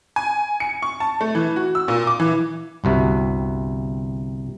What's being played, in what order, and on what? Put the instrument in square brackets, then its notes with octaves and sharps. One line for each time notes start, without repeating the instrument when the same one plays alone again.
[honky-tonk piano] G#5
C#7
C#6
A5
A3
E3
F#4
E6
A#2
D6
E3
[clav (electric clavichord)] G1 C2 C3 F#4